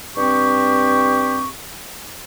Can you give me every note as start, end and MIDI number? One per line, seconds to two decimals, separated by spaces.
0.16 1.48 43
0.16 1.48 60
0.16 1.48 67
0.16 1.48 85